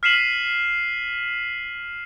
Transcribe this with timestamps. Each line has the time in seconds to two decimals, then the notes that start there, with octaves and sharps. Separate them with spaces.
0.03 F6 B6 C7 D#7 E7 F#7